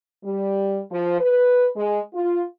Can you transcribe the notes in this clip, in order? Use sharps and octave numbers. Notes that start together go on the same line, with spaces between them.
G3
F3
B4
G#3
F4